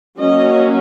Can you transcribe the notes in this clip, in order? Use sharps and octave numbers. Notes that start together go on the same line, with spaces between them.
F#3 A#3 C#4 D#5